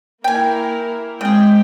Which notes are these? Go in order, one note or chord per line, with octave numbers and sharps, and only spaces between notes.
A#3 E4 A#4 G5 G#5
C#3 G#3 C4 G#4 G5